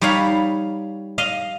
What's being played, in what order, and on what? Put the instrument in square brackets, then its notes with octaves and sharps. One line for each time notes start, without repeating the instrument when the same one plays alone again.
[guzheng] G3 D#4 C#5 F5 B5
D#5 F5